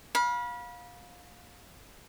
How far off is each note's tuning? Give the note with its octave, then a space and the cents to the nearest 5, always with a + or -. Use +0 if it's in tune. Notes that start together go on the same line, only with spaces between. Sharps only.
F5 +25 B5 -30